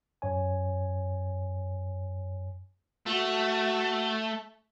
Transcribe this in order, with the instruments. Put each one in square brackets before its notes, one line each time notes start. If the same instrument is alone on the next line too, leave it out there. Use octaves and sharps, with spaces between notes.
[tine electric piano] F#2 C#5 G#5
[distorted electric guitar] A3 [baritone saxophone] F#4